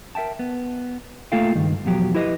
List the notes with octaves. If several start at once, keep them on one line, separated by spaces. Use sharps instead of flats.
A#4 E5 G5 A5
B3
A3 A#3 F4 A4 F5 G5
C#2 G2 D#3
E2 B2 F3 F#3 G4
E4 G4 B4 D#5